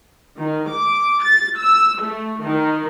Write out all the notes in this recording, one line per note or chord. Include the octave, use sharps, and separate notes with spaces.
D#3
D6
A6
E6
A3
D#3